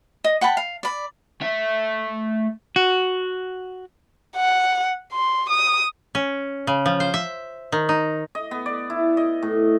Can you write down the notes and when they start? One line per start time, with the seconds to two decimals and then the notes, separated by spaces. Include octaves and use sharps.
0.24 D#5
0.41 F#5 G5 A5 B5
0.57 F5
0.83 D5 B5
1.42 A3 E5
2.76 F#4
4.36 F#5
5.12 C6
5.50 D#6
6.15 C#4
6.67 C#3
6.86 F3
7.00 C5
7.14 E5
7.72 D#3
7.89 D#4
8.35 D#5
8.51 B3
8.66 D5
8.90 E4
9.17 D#5
9.43 A2